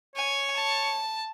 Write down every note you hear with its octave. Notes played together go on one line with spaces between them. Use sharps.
C#5 G#5
A5